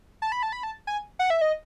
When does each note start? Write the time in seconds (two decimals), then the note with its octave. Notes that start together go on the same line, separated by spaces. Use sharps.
0.22 A5
0.32 B5
0.43 A5
0.52 B5
0.63 A5
0.87 G#5
1.19 F#5
1.30 E5
1.41 D#5